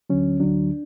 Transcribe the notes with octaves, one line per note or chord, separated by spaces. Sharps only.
D2 D3 F#3 C#4
D2 D3 F#3 D4